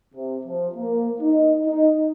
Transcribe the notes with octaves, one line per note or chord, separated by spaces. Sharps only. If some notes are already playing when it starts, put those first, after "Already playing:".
C3
F3
A#3
D#4
D#4